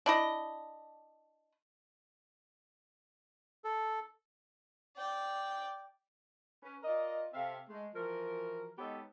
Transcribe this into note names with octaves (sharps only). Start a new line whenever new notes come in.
D4 E4 D#5
A4
D5 G5
C#4 B4
F4 A#4 D5 D#5
C3 C4 A4 E5 F5
G#3 A3
E3 F3 F#4 A#4
G#3 B3 D#4 G4 A4 C#5